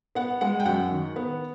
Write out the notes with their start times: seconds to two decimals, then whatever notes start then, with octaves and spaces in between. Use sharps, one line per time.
0.15 B3 F#5
0.41 G#3 F#5
0.60 G5
0.66 F#2 F#5
0.91 D#3
1.16 B3